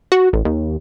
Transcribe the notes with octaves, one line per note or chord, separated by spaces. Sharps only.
F#4
A1
D#2